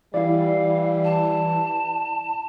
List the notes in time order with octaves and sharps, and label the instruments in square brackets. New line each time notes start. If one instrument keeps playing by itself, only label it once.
[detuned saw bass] E3 [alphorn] G3 [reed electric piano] E4 D5 [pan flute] F5
[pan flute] A5